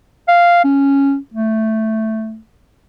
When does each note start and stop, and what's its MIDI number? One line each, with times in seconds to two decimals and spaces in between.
0.28 0.63 77
0.64 1.17 61
1.34 2.38 57